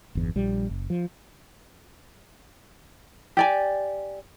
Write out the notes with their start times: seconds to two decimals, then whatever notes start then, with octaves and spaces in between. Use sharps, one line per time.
0.15 G1 E2
0.36 A#1 G3
0.69 F#1
0.90 F3
3.37 G4 D5 G#5